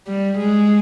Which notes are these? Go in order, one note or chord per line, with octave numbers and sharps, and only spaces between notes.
G3
G#3